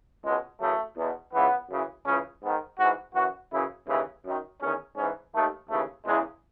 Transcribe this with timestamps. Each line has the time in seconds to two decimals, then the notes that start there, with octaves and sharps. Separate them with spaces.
0.24 C#2 B2 G#3
0.61 F#2 C#3 E3 A3
0.97 E2 B2
1.33 C#2 C#3 E3 B3
1.70 F#2 C#3 E3
2.06 C#2 C#3 E3 C#4
2.43 G#2 D#3 B3
2.79 G#2 E3 F#4
3.15 F#2 E3 F#4
3.51 F#2 C#3 E3 E4
3.88 D#2 C#3 E3
4.25 F#2 D#3
4.61 E2 D#3 C#4
4.97 G#2 E3 C#4
5.34 D#2 D#3 A3
5.70 D#2 C#3 E3 A3
6.06 E2 C#3 E3 G#3